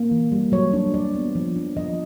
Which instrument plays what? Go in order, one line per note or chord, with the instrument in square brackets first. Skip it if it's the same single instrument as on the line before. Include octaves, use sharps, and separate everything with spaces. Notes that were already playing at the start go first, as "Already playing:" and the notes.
Already playing: [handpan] A#3
E3
G3
F#3 C#5
D4
F#3 D5
B3
F3
D4
F3 D#5